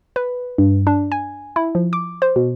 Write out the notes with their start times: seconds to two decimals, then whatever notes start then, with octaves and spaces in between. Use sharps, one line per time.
0.16 B4
0.58 G2
0.87 D4
1.12 G#5
1.56 E4
1.75 F3
1.93 D6
2.22 C5
2.36 B2